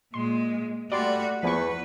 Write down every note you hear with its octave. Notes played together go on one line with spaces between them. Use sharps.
A#2 G#3 C6
G3 A3 F#4 D5 C6
E2 F3 B3 B4 C#6